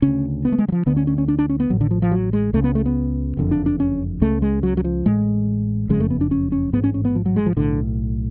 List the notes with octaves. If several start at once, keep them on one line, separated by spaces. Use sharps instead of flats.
D2 C#3 C#4
B3
A3
G#3
F#3
F3
D2 D3 B3
C#4
C#4
C#4
D4
D4
C#4
B3
A1 A2 F#3
D3
F3
F3
F#3
G#3
C#2 C#3 A3
B3
A3
B3
F#1 F2 D3
D4
D4
C#4
C#2 C#3 A3
G#3
F#3
F#3
F3
A1 A2 G#3
F#1 F2 C#3 G#3
A3
B3
D4
C#4
C#4
A1 G#2 B3
C#4
C#4
B3
F3
F#3
G#3
F3
B1 A2 D3